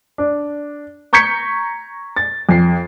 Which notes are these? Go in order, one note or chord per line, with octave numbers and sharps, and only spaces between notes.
D4
A#5 C#6 G6 G#6 B6 C#7
A6
F2 C7